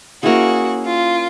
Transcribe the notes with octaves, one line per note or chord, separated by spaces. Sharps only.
A#3 C#4 E4 F#4 G#4
F4